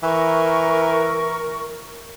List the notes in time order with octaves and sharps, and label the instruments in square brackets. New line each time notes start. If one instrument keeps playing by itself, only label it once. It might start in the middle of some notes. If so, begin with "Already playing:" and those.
[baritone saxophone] E3 [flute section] A#4 C#6